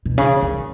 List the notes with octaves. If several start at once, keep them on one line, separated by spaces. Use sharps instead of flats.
B2
C#3
D#3